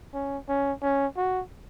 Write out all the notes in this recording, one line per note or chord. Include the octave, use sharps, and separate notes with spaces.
C#4
C#4
C#4
F#4